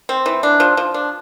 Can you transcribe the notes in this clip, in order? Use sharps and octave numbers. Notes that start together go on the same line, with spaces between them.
C4
E3
D4
F3
F3
D4